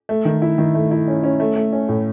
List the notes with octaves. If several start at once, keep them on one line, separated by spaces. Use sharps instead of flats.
A3
D#3
E4
D#3
A3
E4
C#4
C#4
A3
A3
C#4
A2